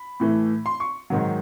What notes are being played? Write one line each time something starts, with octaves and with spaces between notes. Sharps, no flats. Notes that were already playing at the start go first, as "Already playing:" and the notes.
Already playing: B5
A2 E3 A3
C6
C#6
G#2 D#3 F#3